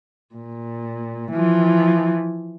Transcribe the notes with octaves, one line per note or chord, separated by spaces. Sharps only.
A#2
E3 F3